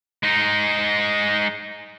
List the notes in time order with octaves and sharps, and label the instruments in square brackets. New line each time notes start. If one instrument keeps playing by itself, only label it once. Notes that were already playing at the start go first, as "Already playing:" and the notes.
[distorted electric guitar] G#3 D#4